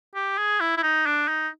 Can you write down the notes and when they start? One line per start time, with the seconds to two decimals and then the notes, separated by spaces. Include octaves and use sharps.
0.15 G4
0.38 G#4
0.61 E4
0.77 E4
0.83 D#4
1.06 D4
1.28 D#4